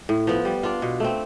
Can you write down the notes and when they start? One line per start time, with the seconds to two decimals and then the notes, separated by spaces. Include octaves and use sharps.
0.09 A2
0.27 F3 B3
0.45 G3
0.63 D4 F4
0.82 B2
1.00 A3 C4